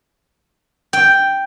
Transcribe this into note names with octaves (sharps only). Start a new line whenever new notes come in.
G5